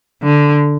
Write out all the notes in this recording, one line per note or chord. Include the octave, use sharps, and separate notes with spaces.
D3